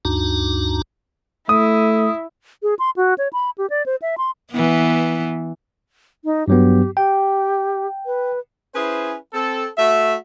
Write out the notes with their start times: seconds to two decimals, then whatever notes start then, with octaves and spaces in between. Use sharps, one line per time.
0.05 D2 G2 D4 D#4 F#4 A#5
1.49 A3 E4 D#6
2.63 G#4
2.79 C6
2.96 F#4
3.18 C#5
3.33 B5
3.58 G4
3.70 D5
3.86 C5
4.02 E5
4.18 C6
4.51 E3 B3
6.25 D#4
6.48 G2 F#3 B3 G4
6.97 G4 G5
8.06 B4
8.75 C#4 E4 G#4 B4 C5
9.34 C4 A4
9.78 A3 F#4 E5